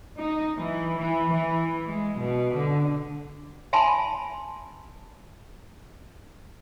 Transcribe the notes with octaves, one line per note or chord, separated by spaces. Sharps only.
D#4
E3
E3
E3
G#3
B2
D3
E5 G#5 A5 B5 C6